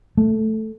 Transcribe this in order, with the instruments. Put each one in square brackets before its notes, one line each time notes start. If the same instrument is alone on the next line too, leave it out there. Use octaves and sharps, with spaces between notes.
[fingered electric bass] A3